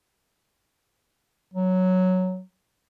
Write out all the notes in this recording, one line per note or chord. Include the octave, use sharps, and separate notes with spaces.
F#3